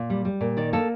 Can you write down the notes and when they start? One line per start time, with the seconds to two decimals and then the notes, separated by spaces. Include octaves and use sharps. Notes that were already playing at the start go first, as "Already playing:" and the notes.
Already playing: A#2
0.10 G3
0.25 G3
0.41 A#2
0.57 D#3 D5
0.73 A#3 A4